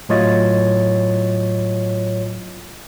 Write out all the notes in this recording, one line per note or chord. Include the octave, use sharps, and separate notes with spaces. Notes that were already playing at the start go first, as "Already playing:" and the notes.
A2 F#3 F4 C#5 D#5 A6